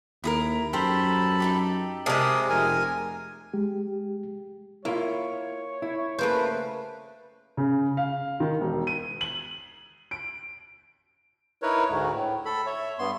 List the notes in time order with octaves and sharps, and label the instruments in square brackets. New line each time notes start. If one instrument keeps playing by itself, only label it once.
[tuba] D#2 [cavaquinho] E4 G#4 A#4
[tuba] F#2 [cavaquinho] G4 A#4 C5 [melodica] A4 A5 B5
[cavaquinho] D#4 E4 G4
[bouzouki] C3 G#3 [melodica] G4 A#4 D#6 [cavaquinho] D5 E5 A5
[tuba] F1 [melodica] A#4 G#5
[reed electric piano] G#3 G4
[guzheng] A#3 [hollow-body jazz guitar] E4 F4 [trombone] C#5
[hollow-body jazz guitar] E4
[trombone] C#3 [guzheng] A3 A#3 C5 [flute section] B4 F5
[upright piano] C#3
F5
D#3
E1
D#7
F#7
D7
[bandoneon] D#4 E4 A#4 B4 C#5
D2 G#2 A3
A2
A4 B5
C#5 E5
G2 B3 C6